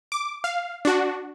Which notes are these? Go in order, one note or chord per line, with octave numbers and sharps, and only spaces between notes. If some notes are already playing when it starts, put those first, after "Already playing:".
D6
F5
D4 F#4